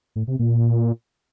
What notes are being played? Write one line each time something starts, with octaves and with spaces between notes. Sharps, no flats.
A2
C3
A#2